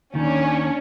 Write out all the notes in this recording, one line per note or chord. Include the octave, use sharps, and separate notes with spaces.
D#2 D#3 C#4 D4